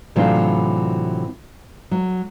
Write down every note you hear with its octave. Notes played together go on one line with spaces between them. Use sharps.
A2 C3 E3 F#3 D4 F4
F#3